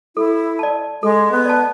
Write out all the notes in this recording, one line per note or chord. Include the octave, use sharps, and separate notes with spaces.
E4 A4
D5 A5
G#3 A4
B3
D5 A5